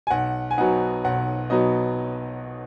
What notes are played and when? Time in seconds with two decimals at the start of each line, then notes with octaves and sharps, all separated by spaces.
0.07 G#5
0.10 B1 F#5
0.51 G#5
0.58 B2 F#3 B3 D#4 F#5
1.05 B1 F#5
1.50 B2 F#3 B3 D#4 D#5